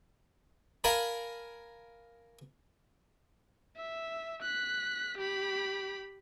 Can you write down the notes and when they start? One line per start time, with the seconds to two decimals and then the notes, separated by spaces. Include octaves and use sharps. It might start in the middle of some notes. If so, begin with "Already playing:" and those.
0.84 A#4 F5 G#5 A5 B5
3.77 E5
4.42 F#6 B6
5.18 G4 B5